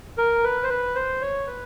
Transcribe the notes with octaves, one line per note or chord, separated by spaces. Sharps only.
A#4
B4
C5
B4
C5
C#5
B4